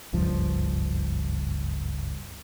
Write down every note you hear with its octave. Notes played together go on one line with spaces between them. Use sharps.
F#1 C#2 G2 F3